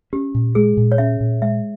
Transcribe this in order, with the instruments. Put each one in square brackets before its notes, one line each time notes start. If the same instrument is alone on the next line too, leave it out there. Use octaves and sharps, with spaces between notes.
[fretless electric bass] C#4 [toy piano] G4
[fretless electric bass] A#2
[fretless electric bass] G#3 [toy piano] G#4
[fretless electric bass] A#2
[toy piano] C#5
[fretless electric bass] C#4 [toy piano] E5
[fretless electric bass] A#2
[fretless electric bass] G#3 [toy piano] E5